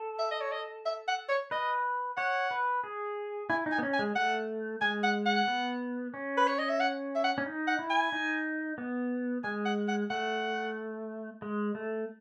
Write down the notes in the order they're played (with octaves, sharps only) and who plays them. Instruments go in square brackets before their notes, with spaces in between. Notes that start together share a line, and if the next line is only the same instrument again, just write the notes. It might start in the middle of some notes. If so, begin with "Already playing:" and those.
Already playing: [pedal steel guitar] A4
[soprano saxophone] E5
D#5
C#5
D#5
E5
F#5
C#5
[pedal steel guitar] B4 [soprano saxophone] D#5
[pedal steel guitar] C#5 [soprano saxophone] F#5
[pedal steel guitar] B4
G#4
[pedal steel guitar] E4 [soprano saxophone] G#5
[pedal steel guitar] D#4
[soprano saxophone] G#5
[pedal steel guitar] B3
C#4
[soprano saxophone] G#5
[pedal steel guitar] G#3
[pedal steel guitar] A3 [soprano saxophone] F#5
[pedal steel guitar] G#3 [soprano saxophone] G#5
[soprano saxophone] F#5
F#5
[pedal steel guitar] B3
C#4
[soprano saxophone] B4
C#5
D#5
E5
F#5
E5
F#5
[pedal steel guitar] C#4
D#4
[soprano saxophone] F#5
[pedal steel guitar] E4
[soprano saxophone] G#5
[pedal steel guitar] D#4
B3
[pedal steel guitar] G#3 [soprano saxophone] G#5
[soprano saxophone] F#5
F#5
[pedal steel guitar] A3 [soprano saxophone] F#5
[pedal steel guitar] G#3
A3